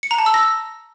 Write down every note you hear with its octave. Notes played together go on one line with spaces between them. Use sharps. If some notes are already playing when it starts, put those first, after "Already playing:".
C#7
A#5
A5
E6
A#6